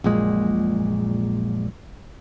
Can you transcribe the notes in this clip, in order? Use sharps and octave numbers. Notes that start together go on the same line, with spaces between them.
A#1 F#2 A#2 G#3